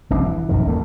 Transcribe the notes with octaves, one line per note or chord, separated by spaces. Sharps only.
F1 C2 D4
E3
A#1 F#2 D#3
D2 A3 A#3